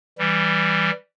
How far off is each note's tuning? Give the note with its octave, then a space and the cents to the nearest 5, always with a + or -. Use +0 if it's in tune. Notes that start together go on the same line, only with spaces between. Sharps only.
E3 +0 G3 +0